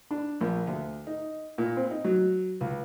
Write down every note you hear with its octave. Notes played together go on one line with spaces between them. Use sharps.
D4
A#1
D2
D#4
A#2
C4
D#4
F#3
C#2